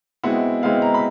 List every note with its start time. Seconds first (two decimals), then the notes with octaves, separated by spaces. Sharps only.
0.23 B2 G#3 C4 E4 F#5
0.62 B2 G#3 C4 E4 F5
0.82 A#5
0.94 B5